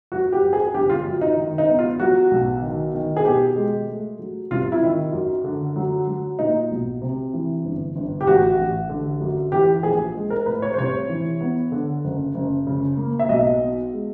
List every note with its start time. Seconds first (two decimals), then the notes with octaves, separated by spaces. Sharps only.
0.12 F#2 F#4
0.32 G4
0.43 F#2
0.53 G#4
0.74 G1 G4
0.89 F4
1.06 F#2
1.21 D#4
1.37 D#3
1.58 D#4
1.68 B3
1.79 F4
2.00 F#3 F#4
2.31 B1
2.62 D#3
2.94 D#3
3.17 G#4
3.25 B2 G4
3.56 G#3
3.87 A3
4.19 F#3
4.51 C2 F4
4.72 E4
4.82 D#3
5.13 F#2
5.44 D3
5.76 F#3
6.07 F#3
6.39 A#2 D#4
6.71 B1
7.01 C3
7.33 E3
7.64 G1
7.96 G1
8.21 G4
8.27 A1 F#4
8.58 A1
8.89 D3
9.21 F#2
9.52 E3 G4
9.83 A#1 G#4
10.15 G#3
10.30 A#4
10.46 A2 B4
10.62 C#5
10.74 C5
10.78 C2 C#5
11.09 E3
11.41 B3
11.72 D3
12.04 F#1
12.34 F#1
12.67 C#3
12.97 A#3
13.19 E5
13.29 B1 D#5
13.60 B3
13.92 G#3